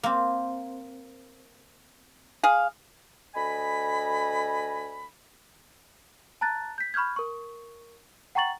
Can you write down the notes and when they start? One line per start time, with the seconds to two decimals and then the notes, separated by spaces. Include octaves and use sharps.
0.03 A#3 C4
2.43 G#4 F5
3.35 D2 D#5 G#5 B5
6.41 A5 A#5 F#6 A6
6.78 G6 B6
6.94 B5 C#6 F6 G6 G#6
7.16 A#4 C#6
8.35 F#5 G5 A#5 C#6 A6 F#7